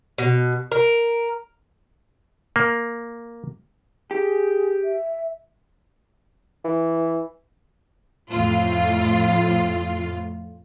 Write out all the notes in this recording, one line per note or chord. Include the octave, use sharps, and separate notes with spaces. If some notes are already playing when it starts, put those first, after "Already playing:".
B2
A#4
A#3
G4 G#4
E5
E3
F2 A2 F4